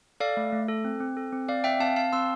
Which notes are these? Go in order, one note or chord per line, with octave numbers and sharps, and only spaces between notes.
A4 D5 F5
A3
A3
A4
C4
C4
A4
C4
C4 D5 F5
C4 E5 G5
C4 F5 A5
C4 F5 A5
C4 C6 E6